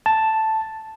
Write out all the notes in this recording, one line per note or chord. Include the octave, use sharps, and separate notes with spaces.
A5